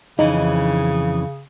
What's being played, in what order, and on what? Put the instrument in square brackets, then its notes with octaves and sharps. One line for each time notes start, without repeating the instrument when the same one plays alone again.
[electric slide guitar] F2 E3 C#4 [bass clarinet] C#3 [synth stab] D#4